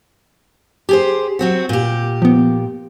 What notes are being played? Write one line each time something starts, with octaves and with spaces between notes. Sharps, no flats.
G4 G#4 C5
F#3 C4 F#4
A#2 G4
F3 B3